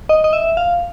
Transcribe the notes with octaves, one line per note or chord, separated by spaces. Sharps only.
D#5
D#5
E5
F5